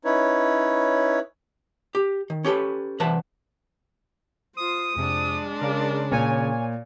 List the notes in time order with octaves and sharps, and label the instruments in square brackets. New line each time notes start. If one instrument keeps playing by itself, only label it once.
[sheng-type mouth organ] C#4 D#4 E4 B4 C#5
[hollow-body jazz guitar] G4
D#3
C#4 G4 A4 B4
C2 E3 B4 F#5 A5
[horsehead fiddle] F4 C5 [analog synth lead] D#6
[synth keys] F2 C3 [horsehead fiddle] G#3 D4
[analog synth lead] C#3 [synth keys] A#4 D5
[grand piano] A#2 [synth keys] C#5 G#5